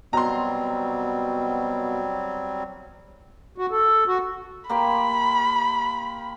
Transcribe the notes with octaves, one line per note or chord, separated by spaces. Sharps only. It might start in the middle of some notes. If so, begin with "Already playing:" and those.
B2 F#3 G3 C4 A#5 C6
F#4
A4
F#4
A#3 G4 B5 C6